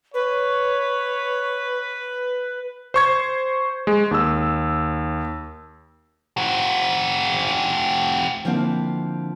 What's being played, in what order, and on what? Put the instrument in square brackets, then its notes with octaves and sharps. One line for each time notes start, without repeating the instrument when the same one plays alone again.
[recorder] B4 [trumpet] C#5
[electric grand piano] C5 C#6 G#6
G#3
D#2 E6
[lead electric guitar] C4 F#4
[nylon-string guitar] D3 F3 A#3 C4 E4